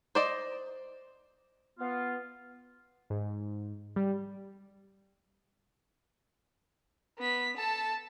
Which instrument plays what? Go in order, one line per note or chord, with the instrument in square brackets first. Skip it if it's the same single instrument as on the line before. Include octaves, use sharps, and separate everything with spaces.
[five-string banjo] C5 D5 D#5
[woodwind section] B3 F4
[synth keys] G#2
G3
[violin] B3 B6
A4 A5